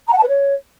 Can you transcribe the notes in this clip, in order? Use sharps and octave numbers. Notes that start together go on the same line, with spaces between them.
A#5
F#5
A5
B4
C#5